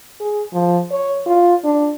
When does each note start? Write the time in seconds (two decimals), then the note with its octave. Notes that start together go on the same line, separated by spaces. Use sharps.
0.21 G#4
0.54 F3
0.91 C#5
1.27 F4
1.64 D4